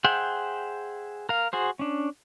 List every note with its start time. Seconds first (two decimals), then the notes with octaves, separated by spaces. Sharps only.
0.04 G#4 C5 E5 F#5 G5
1.29 A#4 F5
1.53 F#4 G#4 C5
1.79 C#4 D4